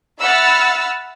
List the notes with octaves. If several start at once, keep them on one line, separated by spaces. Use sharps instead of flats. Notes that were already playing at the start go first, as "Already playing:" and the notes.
E5 F#5 B5 E6 F6 A6